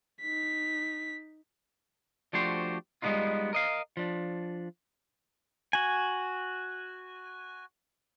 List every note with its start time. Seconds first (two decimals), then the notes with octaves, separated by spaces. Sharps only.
0.21 D#4 B6
2.33 F3 A3 D4 F#4 G4 C5
3.02 G3 G#3 A#3 B3 D#4 F4
3.53 A#4 D#5 F5
3.97 F3 D4
5.73 F#4 G#5